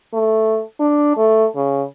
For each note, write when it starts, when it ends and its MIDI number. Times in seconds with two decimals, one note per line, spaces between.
0.14 0.62 57
0.80 1.16 62
1.17 1.46 57
1.56 1.84 49